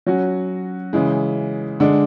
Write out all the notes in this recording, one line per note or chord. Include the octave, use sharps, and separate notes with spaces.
F#3 C#4 F#4
C#3 E3 G#3
D3 G#3 D4